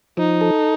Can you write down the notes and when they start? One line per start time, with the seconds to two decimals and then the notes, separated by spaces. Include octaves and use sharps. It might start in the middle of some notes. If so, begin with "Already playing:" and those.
0.17 F3 D#4
0.41 A4